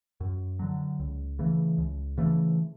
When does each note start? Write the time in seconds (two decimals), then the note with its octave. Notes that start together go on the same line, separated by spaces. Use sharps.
0.20 F#2
0.59 D3 F#3
0.99 C#2
1.39 C#3 E3 A3
1.78 C#2
2.18 C#3 E3 A3